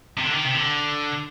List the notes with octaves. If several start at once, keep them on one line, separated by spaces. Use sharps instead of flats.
C3
D3
D#3
C3
D3